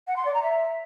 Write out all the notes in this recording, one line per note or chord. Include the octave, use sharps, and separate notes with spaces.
F#5
C6
D5
A#5
E5